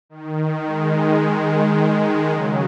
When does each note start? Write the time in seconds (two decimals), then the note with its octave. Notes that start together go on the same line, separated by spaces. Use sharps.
0.09 D#3
0.65 D#3 G#3
2.31 C#3 F#3